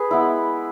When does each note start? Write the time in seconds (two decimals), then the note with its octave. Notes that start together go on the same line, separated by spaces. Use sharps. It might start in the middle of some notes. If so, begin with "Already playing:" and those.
Already playing: G#4 B4
0.11 G#3 B3 E4